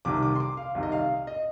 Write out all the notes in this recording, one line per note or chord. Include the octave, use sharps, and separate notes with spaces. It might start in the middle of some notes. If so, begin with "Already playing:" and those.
C2 C3 D#3 D6
D6
C6
D6
F5
C2 C3 D#3
D#5
F5
D#5